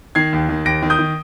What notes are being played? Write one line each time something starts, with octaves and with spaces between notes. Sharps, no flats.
D#3 G#6 C7
D#2
D#3
D#2 A#6 D7
D#3
D#6 G6
D#3